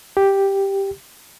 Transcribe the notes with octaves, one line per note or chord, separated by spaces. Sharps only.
G4